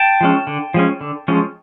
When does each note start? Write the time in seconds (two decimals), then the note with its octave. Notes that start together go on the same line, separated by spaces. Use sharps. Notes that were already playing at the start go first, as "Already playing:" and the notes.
Already playing: G5 A5
0.21 F3 G#3 C#4
0.47 D3
0.74 F3 G#3 C#4
1.01 D3
1.28 F3 G#3 C#4